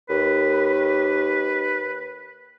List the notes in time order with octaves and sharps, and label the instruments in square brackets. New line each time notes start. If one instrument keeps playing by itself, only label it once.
[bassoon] D#2 [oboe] B4